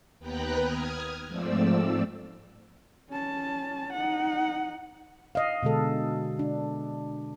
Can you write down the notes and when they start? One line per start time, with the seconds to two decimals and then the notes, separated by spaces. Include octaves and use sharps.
0.19 D#2 B3 B4 G5 A#5 F#6
0.61 D#6 F6 G#6
1.27 G#2 F3 A3 C4 D5 E6
3.09 C#4 A5
3.93 D#4 F#5
5.35 D#5 F5
5.63 B2 D3 G#3 A4
6.39 D4